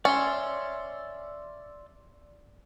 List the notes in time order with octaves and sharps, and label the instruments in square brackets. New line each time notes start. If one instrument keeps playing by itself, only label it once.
[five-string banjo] C#4 [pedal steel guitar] D5 E5 C6